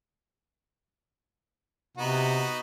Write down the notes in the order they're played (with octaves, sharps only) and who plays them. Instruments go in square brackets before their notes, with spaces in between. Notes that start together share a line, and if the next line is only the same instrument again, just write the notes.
[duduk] C3 [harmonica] B3 D#4 F#4